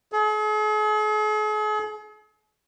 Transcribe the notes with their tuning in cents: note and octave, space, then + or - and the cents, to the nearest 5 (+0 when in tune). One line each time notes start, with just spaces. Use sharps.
G#4 +45